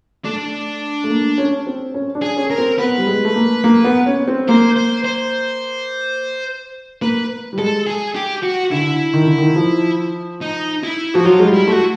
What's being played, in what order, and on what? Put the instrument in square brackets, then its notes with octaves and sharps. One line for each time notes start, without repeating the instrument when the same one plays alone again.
[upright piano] A3 [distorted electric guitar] D4
[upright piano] A3
A#3
C#4
C4
C#4
D4
[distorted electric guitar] G#4
[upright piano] C#4
[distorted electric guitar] A#4
[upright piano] C4
[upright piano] B3 [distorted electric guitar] B4
[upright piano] G3
G#3
A3
A#3
A#3
B3
C#4
C4
[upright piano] A#3 [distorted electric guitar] C5
[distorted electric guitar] C5
C5
[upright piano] A#3 [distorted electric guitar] B4
[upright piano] G3
[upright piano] G#3 [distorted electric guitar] A4
[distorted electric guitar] G#4
G4
F#4
[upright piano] D3 [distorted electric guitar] E4
[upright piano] D#3
D3
D#3
F3
[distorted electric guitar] D#4
E4
[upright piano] F3 [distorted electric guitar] F#4
[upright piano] F#3 [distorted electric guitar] F4
[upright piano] G#3
G3
[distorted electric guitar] E4
[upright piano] A3 [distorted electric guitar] F#4